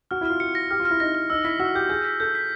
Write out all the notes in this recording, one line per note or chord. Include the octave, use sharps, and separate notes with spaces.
F#4 F6
E4
F4 F6
F#4 C#7
A#6
G4 F6
F4
F6
E4
D#4 A#6
F6
D#4 E6
E4 B6
F#4 E6
G4 G6
G#4 G6
B6
A4 G6
B6